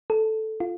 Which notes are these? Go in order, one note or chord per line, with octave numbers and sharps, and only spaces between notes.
A4
F4